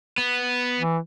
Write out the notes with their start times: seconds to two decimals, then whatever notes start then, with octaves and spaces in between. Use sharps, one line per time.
0.18 B3
0.79 E3